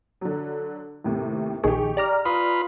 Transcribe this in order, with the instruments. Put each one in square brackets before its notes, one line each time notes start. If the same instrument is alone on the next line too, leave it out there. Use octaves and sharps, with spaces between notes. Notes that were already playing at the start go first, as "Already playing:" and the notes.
[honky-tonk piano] D3 F#3
D#2 A2 C3
[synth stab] A#1 D#3 G#4 [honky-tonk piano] G4 D#5 C#6
[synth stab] D5 A#5 F6
[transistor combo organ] F4 B4 B5 [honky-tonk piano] D#6